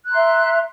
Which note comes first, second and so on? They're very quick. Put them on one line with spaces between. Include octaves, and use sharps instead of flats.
F#6 A#5 C6 E5